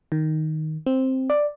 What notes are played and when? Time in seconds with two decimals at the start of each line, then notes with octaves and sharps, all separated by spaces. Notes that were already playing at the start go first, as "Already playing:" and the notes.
0.12 D#3
0.86 C4
1.30 D5